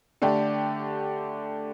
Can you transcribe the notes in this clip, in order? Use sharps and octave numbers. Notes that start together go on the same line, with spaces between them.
D3 A3 D4 G4